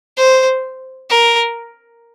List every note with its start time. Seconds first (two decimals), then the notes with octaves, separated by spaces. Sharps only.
0.17 C5
1.10 A#4